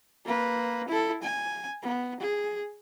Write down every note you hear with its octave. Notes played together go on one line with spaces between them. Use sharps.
A#3 B4
E4 A4
G#5
B3
G#4